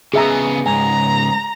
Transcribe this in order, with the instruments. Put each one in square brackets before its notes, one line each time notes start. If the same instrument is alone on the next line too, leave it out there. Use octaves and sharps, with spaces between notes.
[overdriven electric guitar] C#3 B3 [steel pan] G#4 E5 A#5
[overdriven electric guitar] C#2 G#2 [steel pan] G#5 [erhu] A#5